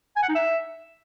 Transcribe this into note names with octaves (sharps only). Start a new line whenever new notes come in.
G#5
F#5
D#4
E5